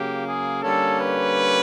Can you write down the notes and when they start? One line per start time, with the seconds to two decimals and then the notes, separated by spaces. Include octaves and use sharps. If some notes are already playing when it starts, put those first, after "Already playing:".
Already playing: C#3 F#3 A#3 G4
0.26 G#4
0.62 D3 G3 A#3 C#4 A4
1.00 B4